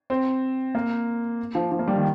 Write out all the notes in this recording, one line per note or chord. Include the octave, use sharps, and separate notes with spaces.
C4
A#3
F3
F3
A#3
G3
D#3